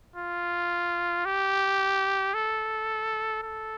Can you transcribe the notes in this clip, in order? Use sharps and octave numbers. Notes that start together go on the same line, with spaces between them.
F4
G4
A4
A4